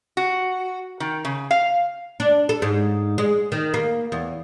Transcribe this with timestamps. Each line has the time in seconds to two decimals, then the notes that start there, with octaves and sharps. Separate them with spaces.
0.17 F#4
1.00 D#3
1.25 C#3
1.51 F5
2.20 D4
2.49 A4
2.62 G#2
3.18 G#3
3.52 D#3
3.74 A#3
4.12 E2